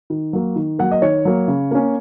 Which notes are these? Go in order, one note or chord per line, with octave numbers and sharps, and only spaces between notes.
D#3
F#3 A#3
D#3
F#3 A#3 F#5
D#5
D#3 C#5
F#3 A#3
C#3
A#3 C#4